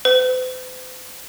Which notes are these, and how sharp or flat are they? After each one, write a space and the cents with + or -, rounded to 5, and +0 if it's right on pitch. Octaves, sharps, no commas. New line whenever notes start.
C5 -45